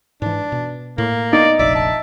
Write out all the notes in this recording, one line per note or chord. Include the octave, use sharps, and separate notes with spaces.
G#2 E3 D4
B2
A2 A#3
B3 D#4 D5
F1 A#1 D5 E5
A5